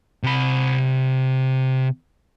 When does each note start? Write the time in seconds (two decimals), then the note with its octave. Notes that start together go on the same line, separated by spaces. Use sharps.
0.23 C3 B5